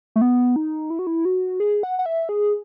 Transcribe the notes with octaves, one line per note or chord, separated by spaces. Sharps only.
A3
B3
D#4
E4
F#4
E4
F#4
G#4
F#5
F#5
E5
G#4